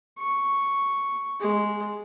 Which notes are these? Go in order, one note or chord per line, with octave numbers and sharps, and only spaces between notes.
C#6
G#3